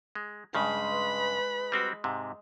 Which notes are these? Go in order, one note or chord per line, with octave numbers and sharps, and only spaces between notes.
G#3
G2 C#3 G#3 B5
B4
G3 C4 F#4
G#2 C3